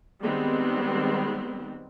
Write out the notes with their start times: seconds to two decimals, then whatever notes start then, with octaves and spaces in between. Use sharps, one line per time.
0.22 D#3 G3 G#3 B3 C4